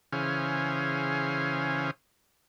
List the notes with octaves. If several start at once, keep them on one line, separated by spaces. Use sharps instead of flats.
C#3 E3 C#4 G#4 C5 F5